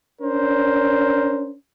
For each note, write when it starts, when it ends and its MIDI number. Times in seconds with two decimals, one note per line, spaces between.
0.21 1.53 61
0.21 1.53 62
0.21 1.53 70
0.21 1.53 72